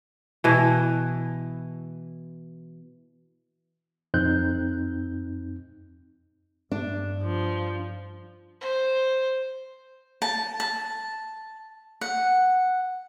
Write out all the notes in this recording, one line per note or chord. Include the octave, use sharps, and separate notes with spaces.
B2 E3
F2 C4 D#4 F#6 G6
G2 D4
F3
C5
A5
A5
F#5